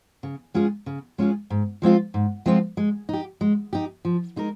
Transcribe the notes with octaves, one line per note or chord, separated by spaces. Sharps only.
C#3
G#3 C#4 F4 G#4
C#3
G#3 C#4 F4 G#4
G#2
F3 G#3 C4 F4
G#2
F3 G#3 C4 F4
G#3
D#4 G4
G#3
D#4 G4
F3
G#3 D#4 A#4